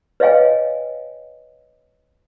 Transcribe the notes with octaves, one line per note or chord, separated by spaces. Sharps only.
B4 C#5 D#5 F5 G5 G#5